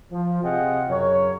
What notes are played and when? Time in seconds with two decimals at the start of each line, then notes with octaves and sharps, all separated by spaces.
0.11 F3
0.43 C3 F4 G#4 D#5 F#5 G5
0.89 F#2 C#3 A#4 C#5